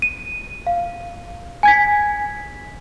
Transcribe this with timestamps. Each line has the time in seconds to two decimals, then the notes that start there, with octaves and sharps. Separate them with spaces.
0.02 D#7
0.67 F5
1.63 G#5 G#6 B6